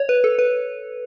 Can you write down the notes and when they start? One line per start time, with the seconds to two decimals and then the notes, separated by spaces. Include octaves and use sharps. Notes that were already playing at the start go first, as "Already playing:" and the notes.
Already playing: C#5
0.09 B4
0.24 A4
0.39 B4